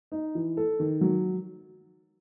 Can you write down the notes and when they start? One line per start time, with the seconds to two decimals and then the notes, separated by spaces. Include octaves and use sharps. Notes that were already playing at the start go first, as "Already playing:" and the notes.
0.12 D#4
0.35 E3
0.57 A4
0.80 D#3
1.01 F#3